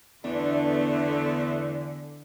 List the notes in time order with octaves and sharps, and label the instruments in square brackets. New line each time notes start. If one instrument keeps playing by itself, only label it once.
[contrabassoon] E2 [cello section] D3 [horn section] A3 B3 [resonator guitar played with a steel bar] D4